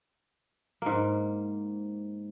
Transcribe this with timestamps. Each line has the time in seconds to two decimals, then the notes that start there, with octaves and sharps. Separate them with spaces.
0.82 G#2 A#3